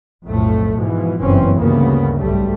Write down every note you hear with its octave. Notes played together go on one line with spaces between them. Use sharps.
B1 F2 A2 A3
G#2 B2 E3 F3
F#1 G2 B2 E3 C4 C#4
D2 G2 C#3 A#3 B3
B1 G#2 G3 A3